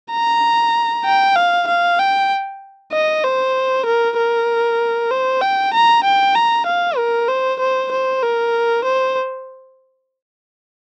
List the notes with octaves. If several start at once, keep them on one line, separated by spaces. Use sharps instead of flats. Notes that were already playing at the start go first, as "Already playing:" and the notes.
A#5
G5
F5
F5
G5
D#5
C5
A#4
A#4
C5
G5
A#5
G5
A#5
F5
A#4
C5
C5
C5
A#4
C5